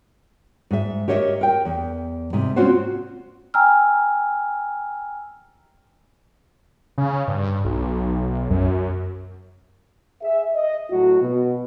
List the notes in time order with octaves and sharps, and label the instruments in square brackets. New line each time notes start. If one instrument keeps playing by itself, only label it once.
[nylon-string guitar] G#2 E5
G4 A#4 C#5 D#5 E5
A#4 G5
E2
G#2 C3
C4 C#4 F4 F#4 C5
[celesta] G5 G#5 A#5 E6 F6
[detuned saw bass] C#3
G2
B1
F#2
[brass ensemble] G#4 E5
D#5
A2 F#3 F#4
B2